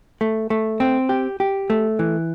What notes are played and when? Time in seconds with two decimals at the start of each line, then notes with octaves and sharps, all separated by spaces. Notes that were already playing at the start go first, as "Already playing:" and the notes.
0.21 A3
0.50 A3
0.80 C4
1.09 G4
1.40 G4
1.70 A3
1.99 E3